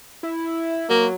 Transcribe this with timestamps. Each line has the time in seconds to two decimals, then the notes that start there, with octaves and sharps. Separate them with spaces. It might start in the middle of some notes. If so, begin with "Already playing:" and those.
0.23 E4
0.38 E4
0.90 F#3 A#3